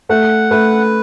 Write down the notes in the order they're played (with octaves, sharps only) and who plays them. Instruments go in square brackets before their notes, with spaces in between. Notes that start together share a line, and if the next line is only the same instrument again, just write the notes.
[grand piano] A3 [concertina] F#5
[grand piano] A3 [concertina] B4